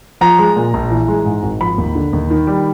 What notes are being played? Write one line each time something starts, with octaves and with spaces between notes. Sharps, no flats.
F3 A#5
G#3
A#2
A#1
E3
G#3
G#2
G#1
F3 B5
D#2
D3
D#2
D#3
G3